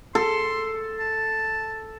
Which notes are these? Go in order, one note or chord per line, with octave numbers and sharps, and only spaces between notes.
A4 C6
A5